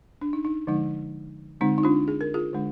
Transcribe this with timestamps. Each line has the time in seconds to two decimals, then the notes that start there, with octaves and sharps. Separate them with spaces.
0.21 D4
0.33 D#4
0.45 D#4
0.67 D3 F3 G#3 D#4
1.61 D3 G#3 C4 D#4
1.78 D#4
1.83 D4 F4
2.08 G#4
2.21 A#4
2.34 F4 G#4
2.53 D3 G#3 D4